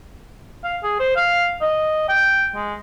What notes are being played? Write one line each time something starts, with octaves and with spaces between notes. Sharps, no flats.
F5
G#4
C5
F5
D#5
G5
G#3